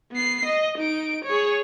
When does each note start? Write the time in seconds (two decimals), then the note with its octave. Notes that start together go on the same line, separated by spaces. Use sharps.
0.12 B3 C7
0.45 D#5
0.78 D#4 D7
1.25 G#4 C#5